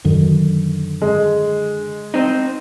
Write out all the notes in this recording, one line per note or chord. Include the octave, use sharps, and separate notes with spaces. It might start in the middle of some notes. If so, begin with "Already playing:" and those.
F#2 D3 D#3
G#3
C4 D#4